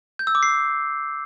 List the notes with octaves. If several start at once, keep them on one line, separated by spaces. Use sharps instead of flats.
G6
E6
D6
C7